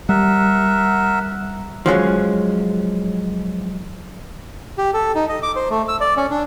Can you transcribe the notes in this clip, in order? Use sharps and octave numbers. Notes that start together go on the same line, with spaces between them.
G3 A#4 E5 F#5
F3 F#3 G#3 C#4
G4
A4
D#4
D#5
D6
C5
A3
E6
D5
C#4
D4